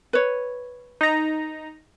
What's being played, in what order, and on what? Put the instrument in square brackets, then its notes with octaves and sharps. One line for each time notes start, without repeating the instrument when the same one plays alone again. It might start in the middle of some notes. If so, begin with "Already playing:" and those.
[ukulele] B4 C#5
[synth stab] D#4 A#5